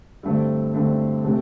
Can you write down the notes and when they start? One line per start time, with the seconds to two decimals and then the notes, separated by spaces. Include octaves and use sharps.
0.23 G2 D3 A3 C4
0.74 G2 D3 A3 C4
1.24 C3 A3